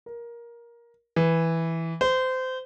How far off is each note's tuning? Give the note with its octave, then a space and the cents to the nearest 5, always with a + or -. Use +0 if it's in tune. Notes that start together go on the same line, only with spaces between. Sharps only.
A#4 +15
E3 -5
C5 -25